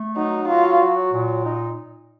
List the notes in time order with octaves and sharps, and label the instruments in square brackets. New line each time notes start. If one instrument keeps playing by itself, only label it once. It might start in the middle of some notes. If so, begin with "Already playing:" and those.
Already playing: [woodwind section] A3
[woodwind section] F#3 [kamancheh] D#4
[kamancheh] F4 [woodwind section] F#4
[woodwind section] F#3
A#2
D#4